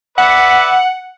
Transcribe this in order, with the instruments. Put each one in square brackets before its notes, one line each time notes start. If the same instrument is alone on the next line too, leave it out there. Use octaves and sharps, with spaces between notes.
[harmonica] B4 D5 E5 [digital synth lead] F#5